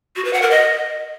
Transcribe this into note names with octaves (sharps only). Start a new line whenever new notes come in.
F#4
B4
F#5
A#4
D#5